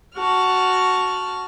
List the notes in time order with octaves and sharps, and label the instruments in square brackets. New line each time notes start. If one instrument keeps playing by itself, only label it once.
[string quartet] F#4 A5 F6